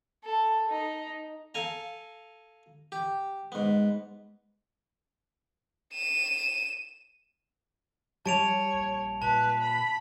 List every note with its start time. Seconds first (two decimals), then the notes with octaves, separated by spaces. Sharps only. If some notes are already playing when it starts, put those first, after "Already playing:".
0.24 A4
0.69 D#4
1.54 A4 F5 G#5 A#5
2.92 G4
3.52 G#2 B3
5.94 D#7 E7
8.26 G3 C#5 A5 D7 F7
8.73 A#1
9.22 A#2 B4 A5
9.61 B5